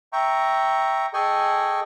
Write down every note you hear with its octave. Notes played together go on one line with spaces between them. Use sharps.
E5 G5 A#5 C#6
G#4 A4 D#5 G5 G#5 C#6